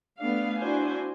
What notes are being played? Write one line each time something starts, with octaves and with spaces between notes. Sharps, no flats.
A3 B3 D4 F5
D4 E4 F#4 C5 G#5